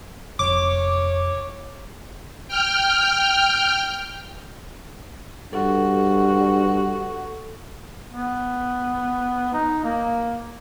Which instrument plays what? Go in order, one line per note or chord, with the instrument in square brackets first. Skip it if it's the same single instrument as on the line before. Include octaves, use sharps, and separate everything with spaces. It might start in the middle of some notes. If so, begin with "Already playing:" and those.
[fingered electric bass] F1 [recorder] C#5 [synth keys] D6
[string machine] G5 F6
[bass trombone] G2 [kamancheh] F#4 [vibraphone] A4
[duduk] B3
D#4
A#3